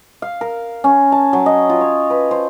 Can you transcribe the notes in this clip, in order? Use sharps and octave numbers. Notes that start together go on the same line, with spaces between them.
F5
A#4
C#4
A5
F#3
D#5
F4
C#5
B4
C5